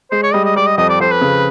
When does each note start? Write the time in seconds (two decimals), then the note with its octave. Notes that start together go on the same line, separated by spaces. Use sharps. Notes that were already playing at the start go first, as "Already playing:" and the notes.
0.11 G#3 C5
0.23 C#5
0.33 G3 D#5
0.45 D#5
0.56 G3 D5
0.67 D#5
0.77 F2 D#5
0.89 D5
1.00 F2 C5
1.12 B4
1.21 C#3